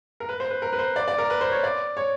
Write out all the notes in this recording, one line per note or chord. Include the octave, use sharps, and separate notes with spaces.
A#4
B4
C5
B4
A#4
B4
C5
D5
D5
A#4
B4
C5
C#5
D5
C#5